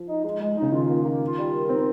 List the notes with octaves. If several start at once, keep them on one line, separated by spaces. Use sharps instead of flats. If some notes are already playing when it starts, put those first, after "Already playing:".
Already playing: F3
D#4
G#3
G#3
C#3 D#4
D#3 F4
A#3
A#3
F4
G3
A#4
C4 D#4